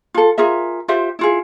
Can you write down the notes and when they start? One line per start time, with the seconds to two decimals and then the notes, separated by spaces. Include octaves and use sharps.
0.14 F4 A4
0.38 F4 G#4 A#4 E5
0.88 F4 G4 C5 E5
1.19 E4 F4 G#4